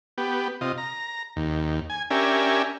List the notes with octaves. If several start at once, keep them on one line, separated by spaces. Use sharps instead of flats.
B3 G4
C3 F4 D#5
A#5
D#2
G#5
C#4 D4 G4 A#4 E5 G#5